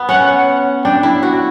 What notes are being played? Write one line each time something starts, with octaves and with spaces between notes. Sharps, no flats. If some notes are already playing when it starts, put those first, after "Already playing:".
Already playing: B3
C#4 F#5
D4 G5
E4
F#4